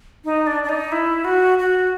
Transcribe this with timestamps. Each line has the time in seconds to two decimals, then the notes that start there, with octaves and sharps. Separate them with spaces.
0.25 D#4
0.47 D4
0.63 D4
0.69 D#4
0.92 E4
1.25 F#4
1.58 F#4